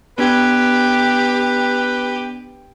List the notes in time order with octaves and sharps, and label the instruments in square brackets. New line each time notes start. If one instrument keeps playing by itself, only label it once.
[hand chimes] B3 D4 G#6 [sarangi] G4 [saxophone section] B4